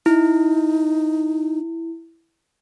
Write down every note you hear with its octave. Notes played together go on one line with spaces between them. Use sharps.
D#4 E4